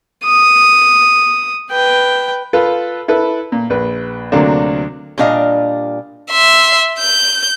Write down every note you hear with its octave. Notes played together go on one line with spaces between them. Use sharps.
D#6
B4 G5
F4 A4 B4
E4 A4 B4
A#2
A#1 B4
D2 C3 F#3 A#3 D4
A#2 G3 D4 D#5 F5
E5 C6
G6